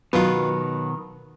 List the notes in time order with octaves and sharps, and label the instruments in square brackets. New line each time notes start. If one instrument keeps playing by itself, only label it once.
[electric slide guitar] B2 D#3 [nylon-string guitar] F#3 B4 [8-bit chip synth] B3 F4